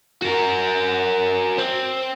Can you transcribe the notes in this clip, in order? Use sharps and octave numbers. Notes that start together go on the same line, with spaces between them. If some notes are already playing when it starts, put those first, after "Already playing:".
F#4 A#4
C4